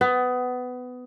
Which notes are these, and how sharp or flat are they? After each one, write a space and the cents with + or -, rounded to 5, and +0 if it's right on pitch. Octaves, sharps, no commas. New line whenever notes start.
B3 +20